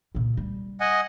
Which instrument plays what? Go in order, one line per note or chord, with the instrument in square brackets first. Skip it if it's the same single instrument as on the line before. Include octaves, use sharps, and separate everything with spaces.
[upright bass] A#2 C#3
G3
[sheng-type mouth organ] D#5 F#5 G#5